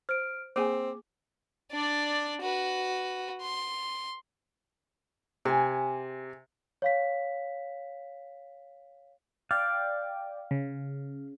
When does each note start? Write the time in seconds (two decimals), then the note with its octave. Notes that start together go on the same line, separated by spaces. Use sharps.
0.09 C5 F6 D7
0.56 A#3 C4 G#4 G#5 D6
1.71 D4 D5
2.42 F#4 B4
3.42 C6
5.45 C3 G#4 G#5
6.82 C#5 F5 B6
9.51 D5 F5 G5
10.51 C#3